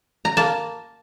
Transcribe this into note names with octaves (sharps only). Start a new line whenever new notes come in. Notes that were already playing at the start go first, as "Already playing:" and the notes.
A#5
A#3 A5